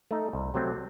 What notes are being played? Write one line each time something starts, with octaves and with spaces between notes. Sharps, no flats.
A3 D#4
C2
C3 F#3 A3 C4